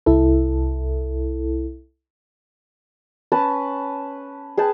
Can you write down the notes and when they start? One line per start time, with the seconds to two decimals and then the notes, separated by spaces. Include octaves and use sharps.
0.06 C2 E4 A4
3.32 C#4 B4 A5
4.58 G#4 B4 G5 A5